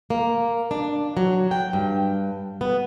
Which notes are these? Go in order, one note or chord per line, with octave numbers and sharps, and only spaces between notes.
A#3
D4
F#3
G5
G2
B3